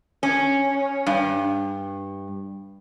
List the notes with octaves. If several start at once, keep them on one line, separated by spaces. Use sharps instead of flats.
C#4
G2